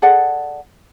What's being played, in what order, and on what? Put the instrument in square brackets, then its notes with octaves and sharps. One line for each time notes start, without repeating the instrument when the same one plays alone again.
[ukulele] G#4 A4 D5 F#5